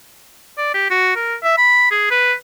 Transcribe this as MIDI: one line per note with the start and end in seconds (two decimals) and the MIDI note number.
0.58 0.73 74
0.74 0.88 67
0.90 1.14 66
1.16 1.35 70
1.43 1.56 76
1.57 1.88 83
1.91 2.10 68
2.10 2.34 71